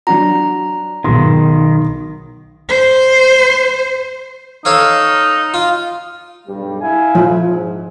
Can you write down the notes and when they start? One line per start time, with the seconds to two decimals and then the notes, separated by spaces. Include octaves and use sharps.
0.07 F#3 D4 F#4 A#5
1.04 B1 B2 D#3 G#4 C6
2.69 C5
4.65 D#4 A4 C#5 F5
5.54 F4
6.47 B1 G2 G3
6.81 E4 F5 G#5
7.15 F3
7.47 G#2